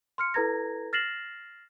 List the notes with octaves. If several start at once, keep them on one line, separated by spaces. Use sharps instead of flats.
C6 F6 C#7
E4 A4 B4 A#5 G#6 A#6
F6 A6 A#6 C7 E7 F#7